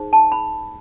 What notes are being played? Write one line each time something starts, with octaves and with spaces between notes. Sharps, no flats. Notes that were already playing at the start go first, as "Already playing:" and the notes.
Already playing: D#4 G#4 C5
A5
B5